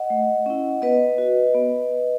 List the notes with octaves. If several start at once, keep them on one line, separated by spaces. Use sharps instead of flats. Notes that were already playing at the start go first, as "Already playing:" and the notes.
Already playing: D#5 F#5
A3
C#4 E4
B3 B4 D#5
F#4
B3